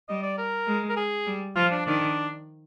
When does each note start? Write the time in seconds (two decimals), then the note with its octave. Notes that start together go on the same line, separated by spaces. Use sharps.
0.09 G3 D#5
0.23 D5
0.38 A#4
0.67 G#3
0.89 A#4
0.97 G#4
1.26 G3
1.56 F3 F4
1.71 D4
1.86 D#3 D4